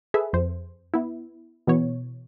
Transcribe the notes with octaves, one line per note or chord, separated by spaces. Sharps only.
G#4 A4 B4 E5
F2 C5
B3 E4
B2 E3 B3 C#5